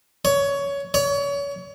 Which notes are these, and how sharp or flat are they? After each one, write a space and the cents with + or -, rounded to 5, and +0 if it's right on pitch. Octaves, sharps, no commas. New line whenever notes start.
C#5 +20
C#5 +35